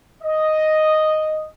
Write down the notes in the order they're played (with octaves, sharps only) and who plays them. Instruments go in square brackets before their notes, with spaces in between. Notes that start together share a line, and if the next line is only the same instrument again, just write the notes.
[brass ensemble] D#5